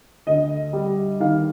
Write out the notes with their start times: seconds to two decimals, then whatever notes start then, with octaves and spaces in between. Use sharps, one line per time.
0.27 D2 D#5
0.73 G3
1.20 D#3 F5